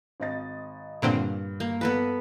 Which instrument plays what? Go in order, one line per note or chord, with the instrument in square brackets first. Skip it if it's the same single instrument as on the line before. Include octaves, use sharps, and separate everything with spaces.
[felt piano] G#1 D#5 A6
[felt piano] G2 [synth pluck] A#2 D3 C4
[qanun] A#3
B3 A4 B4